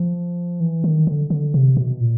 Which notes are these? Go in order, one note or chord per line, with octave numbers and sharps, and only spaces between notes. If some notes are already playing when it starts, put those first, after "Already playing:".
Already playing: F3
E3
D#3
D3
D3
C3
B2
A#2